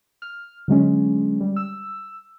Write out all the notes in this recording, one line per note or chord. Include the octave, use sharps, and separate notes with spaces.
F6
D3 F#3 G#3 C#4
G3
E6